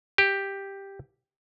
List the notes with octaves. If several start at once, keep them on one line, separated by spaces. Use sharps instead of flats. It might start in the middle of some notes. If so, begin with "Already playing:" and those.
G4